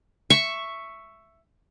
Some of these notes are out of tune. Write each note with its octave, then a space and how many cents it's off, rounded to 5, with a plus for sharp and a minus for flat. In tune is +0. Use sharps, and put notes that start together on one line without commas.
E5 +10 C#6 +0